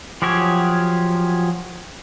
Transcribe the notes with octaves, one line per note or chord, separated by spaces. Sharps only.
F3 F#3 G4 G#4 C#5